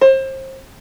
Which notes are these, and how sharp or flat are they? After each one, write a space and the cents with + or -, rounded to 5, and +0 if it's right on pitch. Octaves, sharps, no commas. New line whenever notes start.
C5 +30